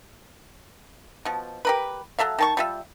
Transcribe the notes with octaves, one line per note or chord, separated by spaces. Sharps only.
B2 F3
G4 A#4 B4
F#3 A4 E5 F5
D#3 A5 C#6
G3 F4 E5